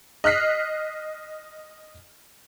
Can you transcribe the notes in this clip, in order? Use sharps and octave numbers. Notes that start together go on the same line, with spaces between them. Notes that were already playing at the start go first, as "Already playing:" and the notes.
D#5 F6 F#6 B6 C7